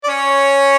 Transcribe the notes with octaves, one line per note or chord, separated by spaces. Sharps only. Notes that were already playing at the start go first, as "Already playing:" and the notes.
D5
C#4 C#5